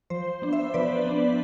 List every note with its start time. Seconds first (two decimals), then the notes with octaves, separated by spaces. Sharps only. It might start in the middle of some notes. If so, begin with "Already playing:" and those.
0.10 F3 C5
0.42 B3 D4
0.53 C5 E5
0.74 F3 B4 D5
1.06 B3 D4